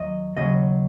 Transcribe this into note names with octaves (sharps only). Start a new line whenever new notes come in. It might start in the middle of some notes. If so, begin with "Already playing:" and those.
Already playing: D#2 F#3 D#5
D#2 C#3 F#3 D#5